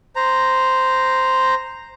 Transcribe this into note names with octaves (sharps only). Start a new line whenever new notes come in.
C5 A#5